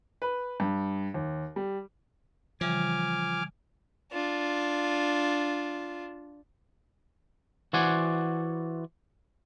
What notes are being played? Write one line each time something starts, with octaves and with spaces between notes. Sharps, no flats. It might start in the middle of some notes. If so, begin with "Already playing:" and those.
B4
G2
D#2
G3
C#3 E3 F3 G3 G#5 D6 F6
D4 F4
E3 F#4 C5 D5 F#5 G#5